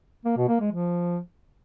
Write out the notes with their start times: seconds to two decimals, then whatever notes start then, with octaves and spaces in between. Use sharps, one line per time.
0.25 A#3
0.37 B2
0.48 A#3
0.60 G#3
0.72 F3